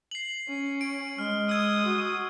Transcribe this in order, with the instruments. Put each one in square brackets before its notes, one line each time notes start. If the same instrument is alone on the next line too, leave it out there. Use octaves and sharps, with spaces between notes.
[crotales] C7 F#7
[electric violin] C#4
[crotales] D7
[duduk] G#3 [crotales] F6
[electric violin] D#6 [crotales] E6 G#6
[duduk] F#4